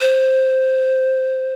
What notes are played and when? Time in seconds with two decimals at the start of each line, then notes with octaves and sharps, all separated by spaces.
0.01 C5